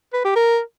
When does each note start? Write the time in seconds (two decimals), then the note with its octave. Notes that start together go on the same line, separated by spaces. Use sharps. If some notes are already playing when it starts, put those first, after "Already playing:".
0.13 B4
0.25 G4
0.36 A#4